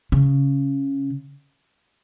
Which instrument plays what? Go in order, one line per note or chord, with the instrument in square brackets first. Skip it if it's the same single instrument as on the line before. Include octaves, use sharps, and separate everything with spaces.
[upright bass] C#3